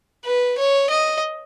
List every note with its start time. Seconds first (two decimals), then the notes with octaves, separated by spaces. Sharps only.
0.25 B4
0.58 C#5
0.90 D#5